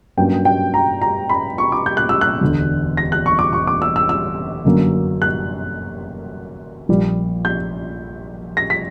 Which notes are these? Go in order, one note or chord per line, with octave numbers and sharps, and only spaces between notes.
G2 F#3 A#3 C#4 G5
G5
A#5
A#5
B5
C#6
D6
G6
F#6
E6
F#6
E1 D2 D3
A#6
F#6
C#6
D6
C#6
D6
E6
E6
E6
G1 F#2 D3 F#3 A#3
F#6
A#1 A#2 G3
G6
A#6
B6